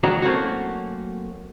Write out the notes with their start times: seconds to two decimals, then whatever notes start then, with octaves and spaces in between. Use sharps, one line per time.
0.03 D#3 F#3 G#3 D4 F#4 A#5
0.22 F#3 A3 A#3 C4 C#4 F#4